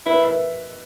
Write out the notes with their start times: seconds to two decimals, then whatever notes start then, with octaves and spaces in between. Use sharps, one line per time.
0.06 E4 B4 E5
0.24 B4 E5